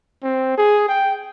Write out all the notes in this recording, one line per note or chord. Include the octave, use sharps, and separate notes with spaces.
C4
G#4
G5